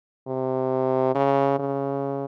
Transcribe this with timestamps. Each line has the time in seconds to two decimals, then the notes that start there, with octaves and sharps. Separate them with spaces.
0.27 C3
1.15 C#3
1.59 C#3